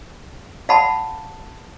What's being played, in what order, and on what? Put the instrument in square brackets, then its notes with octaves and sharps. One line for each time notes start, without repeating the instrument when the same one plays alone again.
[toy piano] F5 F#5 A5 B5